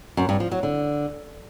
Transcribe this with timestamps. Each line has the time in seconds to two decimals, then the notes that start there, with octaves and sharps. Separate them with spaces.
0.17 F#2
0.29 G2
0.40 F3
0.52 F#3
0.63 D3